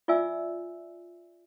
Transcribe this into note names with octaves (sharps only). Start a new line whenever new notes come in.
F4 D5 E5 G#5 E6